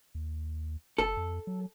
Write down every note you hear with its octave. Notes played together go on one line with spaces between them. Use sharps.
D#2
F#1 A4
F2
F#3